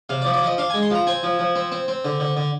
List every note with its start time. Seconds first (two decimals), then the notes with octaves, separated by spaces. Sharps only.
0.09 C3 F5
0.22 D5
0.25 F3
0.34 D5
0.42 F3 D#5
0.58 D4 F5
0.70 G#3 G#5
0.82 C6
0.90 F3 A#5
1.07 C4 G#5
1.23 F3
1.39 F3
1.56 C4
1.72 C4
1.88 C4
2.05 D3
2.20 D3
2.37 D3